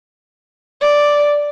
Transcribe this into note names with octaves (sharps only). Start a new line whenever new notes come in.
D5